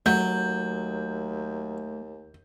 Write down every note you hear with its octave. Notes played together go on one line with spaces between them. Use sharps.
D#2 F#3 A3 G6